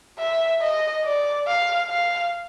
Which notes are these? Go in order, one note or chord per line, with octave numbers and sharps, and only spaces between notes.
E5
D#5
D5
F5
F5